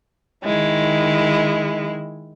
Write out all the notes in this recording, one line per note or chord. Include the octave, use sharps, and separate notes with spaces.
D#3 G#3 E4